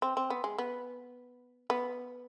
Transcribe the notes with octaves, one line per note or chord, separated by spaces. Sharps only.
C4
C4
B3
G#3
B3
B3